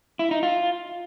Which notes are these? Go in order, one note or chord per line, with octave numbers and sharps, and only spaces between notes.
E4
D#4
F4